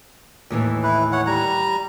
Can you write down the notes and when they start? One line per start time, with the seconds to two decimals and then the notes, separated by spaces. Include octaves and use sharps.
0.50 D#2 A2 E3
0.83 E4 B4
1.12 C#5 F#5
1.27 G3 A#5